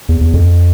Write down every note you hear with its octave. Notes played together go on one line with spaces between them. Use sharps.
E2
E2
F2